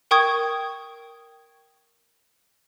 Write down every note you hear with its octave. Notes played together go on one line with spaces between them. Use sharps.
A#4 G5 C#6 D#6 G#6